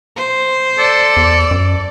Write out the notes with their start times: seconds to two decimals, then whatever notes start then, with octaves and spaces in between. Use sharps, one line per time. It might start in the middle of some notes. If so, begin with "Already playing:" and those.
0.16 C5
0.79 A4 D5
1.17 E2
1.51 F#2